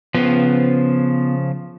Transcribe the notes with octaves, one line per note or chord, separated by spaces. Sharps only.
C#3 F3 B3 B4 C5